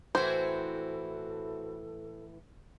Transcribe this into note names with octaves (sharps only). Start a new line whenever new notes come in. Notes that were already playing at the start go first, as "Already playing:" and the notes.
A2 E3 C4 E4 F#4 A4 C5